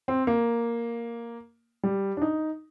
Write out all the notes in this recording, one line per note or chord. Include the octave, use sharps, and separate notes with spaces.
C4
A#3
G3
D4
D#4